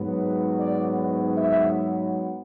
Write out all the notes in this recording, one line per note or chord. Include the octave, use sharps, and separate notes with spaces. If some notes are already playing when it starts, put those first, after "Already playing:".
Already playing: G#2 F#3 B3
D5
E5